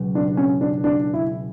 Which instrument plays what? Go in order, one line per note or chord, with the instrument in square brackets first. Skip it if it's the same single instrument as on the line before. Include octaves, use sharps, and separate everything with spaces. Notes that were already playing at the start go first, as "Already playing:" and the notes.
Already playing: [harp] C#2 B2 F#3
[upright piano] D4
C#4
D4
D4
E4